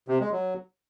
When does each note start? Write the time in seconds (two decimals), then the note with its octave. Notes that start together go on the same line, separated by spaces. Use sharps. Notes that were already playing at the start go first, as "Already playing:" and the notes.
0.08 C3
0.20 G#3
0.32 F#3